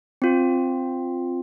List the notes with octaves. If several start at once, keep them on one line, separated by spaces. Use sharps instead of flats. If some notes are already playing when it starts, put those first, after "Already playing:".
C4 F4